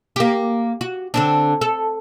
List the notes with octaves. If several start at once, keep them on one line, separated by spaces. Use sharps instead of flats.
A#3 G4
F#4
D3 C4 D4
A4